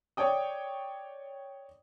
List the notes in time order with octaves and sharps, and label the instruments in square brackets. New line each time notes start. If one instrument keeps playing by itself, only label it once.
[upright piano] C#5 D5 G5 D#6